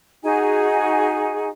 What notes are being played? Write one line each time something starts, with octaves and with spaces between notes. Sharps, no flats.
D#4 F#4 G#4 G#5